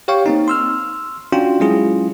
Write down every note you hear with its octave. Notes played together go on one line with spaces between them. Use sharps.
G4 C#5 F5 G5 C#6
A#3 C4 D#4
C6 E6 F6
C#4 D4 F4 F#4 G5
F#3 G#3 C#4 E4 F4 G#4